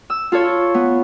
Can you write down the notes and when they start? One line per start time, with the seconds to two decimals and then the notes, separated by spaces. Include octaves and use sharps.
0.10 E6
0.32 F4 A4 C#5
0.74 B3